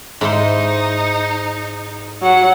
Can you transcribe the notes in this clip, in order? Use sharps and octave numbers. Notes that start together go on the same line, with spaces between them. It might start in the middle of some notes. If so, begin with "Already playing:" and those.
G#2 D#4 E4 C5
F#3 F#5